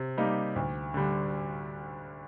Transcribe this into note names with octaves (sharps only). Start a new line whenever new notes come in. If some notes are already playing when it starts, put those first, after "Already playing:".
Already playing: C3
G3 A#3 D#4
D2
D3 G3